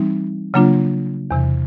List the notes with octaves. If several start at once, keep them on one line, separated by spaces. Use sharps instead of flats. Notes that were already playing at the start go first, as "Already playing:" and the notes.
Already playing: E3 G3 C4 D#4
C#3 F#3 A#3 D4 F4
E2 C3 E3